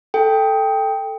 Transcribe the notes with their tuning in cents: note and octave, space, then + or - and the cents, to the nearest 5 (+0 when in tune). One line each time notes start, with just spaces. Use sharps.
A4 +0 G5 +10